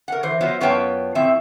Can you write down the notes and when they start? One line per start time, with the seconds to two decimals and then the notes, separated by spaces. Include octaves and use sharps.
0.08 A#4 F#5
0.23 E3 C5
0.41 F#3 B3 F4 C5 D#5 E5
0.61 F#2 B3 F4 C#5 G5 A5
1.15 A2 F3 C4 E5